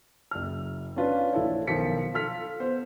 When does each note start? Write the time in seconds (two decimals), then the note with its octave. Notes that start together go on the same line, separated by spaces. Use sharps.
0.31 F#1 F6
0.96 C#4 D4 F4 B4 F5
1.33 A#1 E4 A4 C#5
1.67 B1 D#3 F3 B6 C#7
2.14 F4 A4 F6 B6
2.60 B3 C5